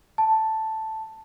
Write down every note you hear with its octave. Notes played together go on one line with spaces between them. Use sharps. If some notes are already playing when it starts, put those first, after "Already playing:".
A5